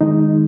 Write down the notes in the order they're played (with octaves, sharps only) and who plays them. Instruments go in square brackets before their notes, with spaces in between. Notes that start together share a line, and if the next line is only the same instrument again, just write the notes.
[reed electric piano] D#3 G#3 D#4